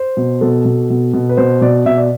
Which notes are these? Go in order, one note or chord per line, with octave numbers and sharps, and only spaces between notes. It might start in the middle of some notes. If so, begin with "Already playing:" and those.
Already playing: C5
B2
B2 A4
B2
B2
B2
B4
B2 C5
B2 D5
B2 E5
D5